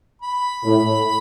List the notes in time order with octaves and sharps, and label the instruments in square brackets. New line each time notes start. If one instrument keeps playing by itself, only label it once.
[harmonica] B5
[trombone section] A2